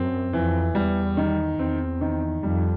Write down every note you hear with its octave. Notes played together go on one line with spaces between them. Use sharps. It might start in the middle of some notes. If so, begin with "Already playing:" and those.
Already playing: F#2 C4
F2 E3
E2 G3
D#3
E2 C4
D#3
F2 G3